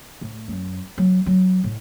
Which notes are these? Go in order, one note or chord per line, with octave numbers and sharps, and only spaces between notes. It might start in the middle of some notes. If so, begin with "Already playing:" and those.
A2
F#2
F#3
F#3
A2